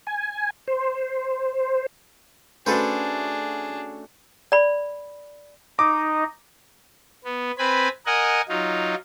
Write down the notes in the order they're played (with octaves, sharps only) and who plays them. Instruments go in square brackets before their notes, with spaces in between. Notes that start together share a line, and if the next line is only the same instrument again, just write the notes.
[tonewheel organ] G#5
C5
[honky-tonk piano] A3 C#4 F#4 [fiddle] D4 G#4 [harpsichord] A4 B4 C5
[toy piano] D5 B5
[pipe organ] D#4 D#5 [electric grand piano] D6
[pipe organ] B3
C4 B4 G#5 B5
A#4 D#5 F#5 G#5
F#3 D#4 F4